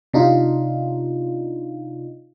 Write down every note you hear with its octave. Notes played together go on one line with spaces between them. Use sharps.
C3 D4 D#4 F4